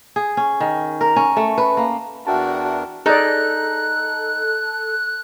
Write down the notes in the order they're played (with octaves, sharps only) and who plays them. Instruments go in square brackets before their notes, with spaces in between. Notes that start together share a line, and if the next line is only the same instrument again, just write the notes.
[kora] G#4
C#4
D#3
A#4
C#4
A3
B4
A#3
[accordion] E2 D4 A#4 [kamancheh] F#4 [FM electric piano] E5 G5 A5
[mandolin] D#4 [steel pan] G#4 D5 [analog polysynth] A4 [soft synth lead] F#6